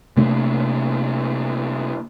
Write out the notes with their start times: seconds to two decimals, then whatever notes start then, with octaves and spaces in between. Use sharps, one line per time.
0.17 C3 A3 A#3 D4